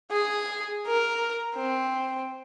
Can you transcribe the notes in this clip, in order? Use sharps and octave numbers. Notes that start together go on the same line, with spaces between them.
G#4 G#5
A#4
C4